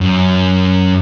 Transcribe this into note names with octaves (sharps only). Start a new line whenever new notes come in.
F#2